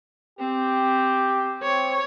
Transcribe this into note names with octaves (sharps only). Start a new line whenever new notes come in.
C4 G4
C4 C#5